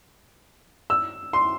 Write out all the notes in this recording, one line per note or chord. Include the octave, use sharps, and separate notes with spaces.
E6
C6